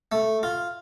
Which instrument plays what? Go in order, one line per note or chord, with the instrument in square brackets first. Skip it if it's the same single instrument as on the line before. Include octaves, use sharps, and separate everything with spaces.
[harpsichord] A3
F4